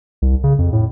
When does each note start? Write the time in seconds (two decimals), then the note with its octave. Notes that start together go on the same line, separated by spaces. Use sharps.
0.22 C2
0.44 C#3
0.59 F2
0.73 A2